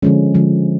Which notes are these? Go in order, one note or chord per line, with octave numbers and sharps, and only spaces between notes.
D3 F3 G#3 C#4
D3 F3 G#3